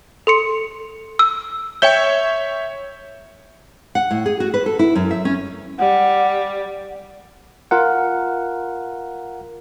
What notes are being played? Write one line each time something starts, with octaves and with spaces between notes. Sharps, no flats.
A4 C6 C#7
E6
C#5 E5 G5 G6 G7
F#5
A2
G#4
F#4
B4
A4
E4
F#2
E5
C#4
G3 F#5
F4 A#4 F#5